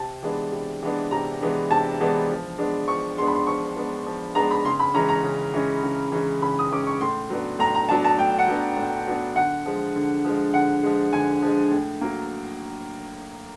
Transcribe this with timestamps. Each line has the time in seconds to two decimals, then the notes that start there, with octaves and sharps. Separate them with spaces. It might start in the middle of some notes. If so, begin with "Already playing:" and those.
Already playing: C3 A5
0.23 E3 G#3 B3 D4
0.52 C3
0.83 E3 G#3 B3 D4
1.11 C3 A#5
1.41 E3 G#3 B3 D4
1.71 C3 A5
2.00 E3 G#3 B3 D4
2.30 F3
2.58 G#3 B3 D4
2.88 F3 C#6
3.18 G#3 B3 D4 C6
3.27 B5
3.35 C6
3.47 F3 C#6
3.76 G#3 B3 D4
4.06 F3
4.35 G#3 B3 D4 A#5
4.51 B5
4.65 C#3 C6
4.79 B5
4.94 E3 G#3 C#4 A#5
5.09 A#5
5.24 C#3
5.54 E3 G#3 C#4
5.84 C#3
6.12 E3 G#3 C#4
6.42 C#3 B5
6.59 D#6
6.71 E3 G#3 C#4 D6
6.87 C#6
7.01 A2 C6
7.30 F#3 B3 D4
7.59 A2 A#5
7.75 A#5
7.89 F#3 B3 D4 A5
8.04 A5
8.18 A2 G5
8.39 F#5
8.47 F#3 B3 D4
8.77 A2
9.08 F#3 B3 D4
9.36 D3 F#5
9.66 F3 G#3
9.96 D3
10.25 F3 G#3
10.54 D3 F#5
10.83 F3 G#3
11.13 D3 G#5
11.42 F3 G#3
11.72 A2
12.01 F#3 A#3